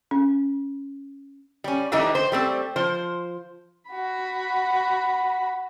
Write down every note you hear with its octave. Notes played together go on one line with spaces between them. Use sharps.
C#4
G3 C#4
D3 E3 G3 A3 D4 D#4
C5
G3 A3 C4
F3 C5
F#4 B5